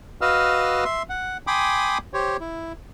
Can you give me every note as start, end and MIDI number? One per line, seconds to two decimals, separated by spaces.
0.21 0.84 66
0.21 0.84 71
0.21 0.84 75
0.21 0.84 77
0.21 0.84 88
0.21 0.84 89
0.85 1.03 76
0.85 1.03 84
1.09 1.37 78
1.47 1.98 79
1.47 1.98 80
1.47 1.98 83
1.47 1.98 84
1.47 1.98 86
1.47 1.98 87
2.14 2.37 67
2.14 2.37 72
2.14 2.37 73
2.40 2.73 64